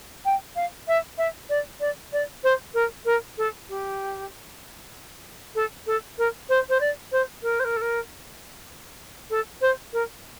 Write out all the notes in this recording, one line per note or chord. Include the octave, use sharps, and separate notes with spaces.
G5
F5
E5
E5
D5
D5
D5
C5
A#4
A#4
A4
G4
A4
A4
A#4
C5
C5
D5
C5
A#4
C5
A#4
A4
A#4
A4
C5
A#4